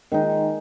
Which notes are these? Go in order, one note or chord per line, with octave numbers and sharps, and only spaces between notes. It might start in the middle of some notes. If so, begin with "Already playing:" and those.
D#3 G#3 D#4